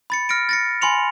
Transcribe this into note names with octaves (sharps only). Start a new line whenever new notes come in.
B5 A6 C#7
F6 A#6 C#7 D7
A6 A#6 C#7
G#5 B5 C6 C#7 F7